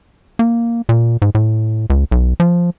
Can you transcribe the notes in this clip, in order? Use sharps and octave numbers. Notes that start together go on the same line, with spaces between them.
A#3
A#2
G#2
A2
C#2
B1
F3